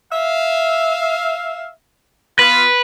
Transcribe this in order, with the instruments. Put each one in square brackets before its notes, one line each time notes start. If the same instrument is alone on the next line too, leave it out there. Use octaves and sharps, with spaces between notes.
[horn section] E5 F5
[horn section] B3 F4 [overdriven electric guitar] B4